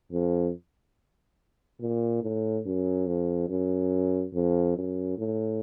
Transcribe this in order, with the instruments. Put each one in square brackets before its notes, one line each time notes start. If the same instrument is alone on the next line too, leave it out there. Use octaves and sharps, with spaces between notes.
[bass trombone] F2
A#2
A2
F#2
F2
F#2
F2
F#2
A2